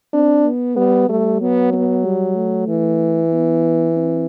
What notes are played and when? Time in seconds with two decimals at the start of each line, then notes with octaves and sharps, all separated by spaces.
0.14 C4 D4
0.45 B3
0.77 G3 B3
1.09 G3 A3
1.41 F#3 B3
1.73 B3
2.05 G3
2.36 A3
2.68 E3
3.32 B3
3.96 C4